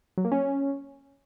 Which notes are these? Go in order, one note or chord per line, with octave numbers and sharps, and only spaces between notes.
F#3
A#3
C#4